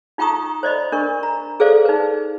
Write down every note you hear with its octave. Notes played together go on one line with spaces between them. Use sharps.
D#4 F4 G5 A#5 C#6 D#6
C5 D5 D#5 B5
D4 A#4 C#6
A#5
G#4 A4 B4 C5 D5 F5
D#4 B4